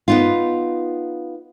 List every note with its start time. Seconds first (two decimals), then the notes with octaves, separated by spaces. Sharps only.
0.08 B3 D#4 F4